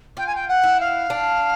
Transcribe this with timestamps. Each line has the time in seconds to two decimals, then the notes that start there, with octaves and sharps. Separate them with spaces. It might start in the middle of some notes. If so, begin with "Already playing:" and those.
0.17 F4 G5
0.26 G#5
0.35 G5
0.48 F#5
0.64 E4
0.80 F5
1.10 D4